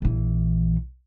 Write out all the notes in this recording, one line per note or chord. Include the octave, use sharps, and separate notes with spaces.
A#1 E3